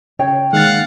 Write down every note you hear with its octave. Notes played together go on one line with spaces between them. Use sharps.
C#3 C#5 G5
D#3 G#3 A#3 F5 F#5 A6